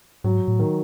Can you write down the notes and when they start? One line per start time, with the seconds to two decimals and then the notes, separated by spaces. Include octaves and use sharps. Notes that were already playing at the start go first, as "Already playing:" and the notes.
0.24 G#2 F#3
0.48 A2
0.59 D#3